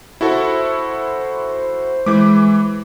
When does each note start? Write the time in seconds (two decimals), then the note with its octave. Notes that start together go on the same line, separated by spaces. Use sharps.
0.21 E4 F#4 A4 C5
2.06 E3 G#3 D6